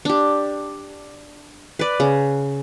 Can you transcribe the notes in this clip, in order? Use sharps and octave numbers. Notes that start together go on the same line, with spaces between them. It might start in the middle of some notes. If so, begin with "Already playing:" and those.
D4 G4
B4 D5
C#3